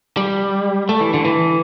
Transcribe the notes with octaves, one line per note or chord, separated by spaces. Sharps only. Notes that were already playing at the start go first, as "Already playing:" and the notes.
G3
A3
E3
D3
E3